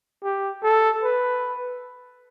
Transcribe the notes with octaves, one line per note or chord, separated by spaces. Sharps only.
G4
A4
B4